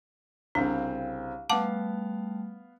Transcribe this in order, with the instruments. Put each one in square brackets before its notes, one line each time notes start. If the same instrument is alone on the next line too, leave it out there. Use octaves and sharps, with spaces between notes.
[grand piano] C2 C#3 C4 [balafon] D4 [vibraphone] F5
[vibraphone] G3 A3 [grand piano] B3 F5 [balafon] F#5 A5 D6